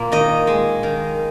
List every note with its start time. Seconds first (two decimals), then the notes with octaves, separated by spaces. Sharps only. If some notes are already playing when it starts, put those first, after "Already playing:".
Already playing: A#2 A#3
0.12 D#3 D#5
0.47 G#3
0.83 D#3